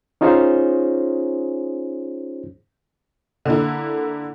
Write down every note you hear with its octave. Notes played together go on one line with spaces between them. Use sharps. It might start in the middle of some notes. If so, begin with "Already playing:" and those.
C#4 D#4 F4 G#4 C5 C#5
D3 A#3 E4